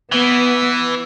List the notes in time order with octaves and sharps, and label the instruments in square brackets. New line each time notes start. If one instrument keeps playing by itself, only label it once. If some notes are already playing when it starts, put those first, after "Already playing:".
[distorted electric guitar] E3 [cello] B3